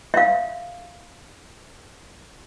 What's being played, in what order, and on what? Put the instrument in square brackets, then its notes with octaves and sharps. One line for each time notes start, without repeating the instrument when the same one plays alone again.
[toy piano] E5 F5